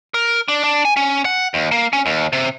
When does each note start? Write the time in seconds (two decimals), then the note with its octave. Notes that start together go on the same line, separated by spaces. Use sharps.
0.14 A#4
0.48 D4
0.64 D4
0.85 G#5
0.97 C#4
1.25 F#5
1.54 D#2
1.72 A#3
1.93 C#4
2.06 D#2
2.33 C3